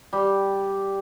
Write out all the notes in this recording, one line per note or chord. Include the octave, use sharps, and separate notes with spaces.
G3